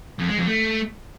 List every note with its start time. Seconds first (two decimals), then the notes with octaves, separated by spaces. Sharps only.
0.19 F2
0.28 G#3
0.37 F2
0.47 A3